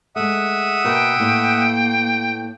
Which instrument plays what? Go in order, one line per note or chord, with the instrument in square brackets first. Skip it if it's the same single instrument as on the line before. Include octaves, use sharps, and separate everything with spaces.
[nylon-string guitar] G#3 A3 [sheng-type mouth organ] E5 F#5 D#6
[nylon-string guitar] B2 A#3 [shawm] G5
[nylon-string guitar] A2 B3 [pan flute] A#3